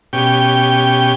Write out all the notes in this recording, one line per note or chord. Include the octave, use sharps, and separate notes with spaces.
B2 C#4 G4 G5